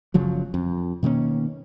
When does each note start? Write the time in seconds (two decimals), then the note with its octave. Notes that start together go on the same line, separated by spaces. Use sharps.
0.14 F#1 C#3 F3 F#3
0.54 F2
1.03 B2 D#3 A#3 C#4